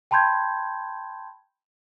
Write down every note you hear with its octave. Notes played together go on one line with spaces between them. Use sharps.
G5 A5 B5 C6 G6 G#6